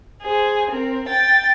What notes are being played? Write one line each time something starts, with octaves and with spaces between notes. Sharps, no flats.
G#4 C5
C4 A#4
G5 A6